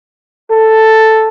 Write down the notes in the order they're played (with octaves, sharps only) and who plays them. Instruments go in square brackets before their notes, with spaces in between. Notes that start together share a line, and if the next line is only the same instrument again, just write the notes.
[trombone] A4